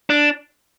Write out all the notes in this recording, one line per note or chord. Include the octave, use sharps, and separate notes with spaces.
D4